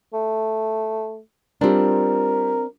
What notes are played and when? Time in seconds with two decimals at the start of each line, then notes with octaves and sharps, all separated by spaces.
0.13 A3
1.61 G3 C4 D4 F4 A#4